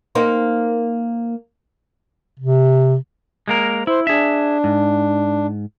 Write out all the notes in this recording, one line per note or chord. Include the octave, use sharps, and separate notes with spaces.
A#3 C4 D#4
C3
G#3 A#3 A#4
E4 C5
D4 G#4 E5
G#2